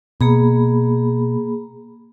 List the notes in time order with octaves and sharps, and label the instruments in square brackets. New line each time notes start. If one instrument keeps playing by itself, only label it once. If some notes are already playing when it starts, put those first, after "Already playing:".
[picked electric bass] B2 [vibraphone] A#3 G#4 B5